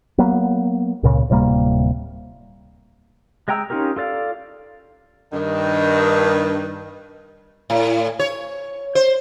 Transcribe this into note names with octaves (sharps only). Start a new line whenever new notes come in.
F#3 A#3 B3
C#2 A#2 C#3
D1 C3 G3 A#3
G#3 D#5 G5 A#5 E6
C#4 D#4 F4 G4 A#4
F4 A4 D5 F5
G2 D#3
A2
C#5
C5